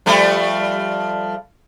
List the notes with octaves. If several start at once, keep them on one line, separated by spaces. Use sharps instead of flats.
F3 G3 A3